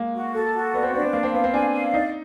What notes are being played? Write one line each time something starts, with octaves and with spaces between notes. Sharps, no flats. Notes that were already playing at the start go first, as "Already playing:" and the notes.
Already playing: G#3 A#3
F#4
A4
F#4
B3 D5
C4
C4 D4
B3
A#3 F5
C4
B3 F5
C4
D4 G#5
F5
D#4 D5